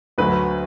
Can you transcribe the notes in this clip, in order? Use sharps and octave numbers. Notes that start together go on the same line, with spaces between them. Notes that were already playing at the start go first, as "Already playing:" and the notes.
D2 D3 F#3 B4